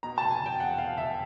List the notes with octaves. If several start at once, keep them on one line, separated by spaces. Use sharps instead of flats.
B2 A#5
A5
F1
G#5
F1
G5
E2 F#5
B2 F5
F1 E5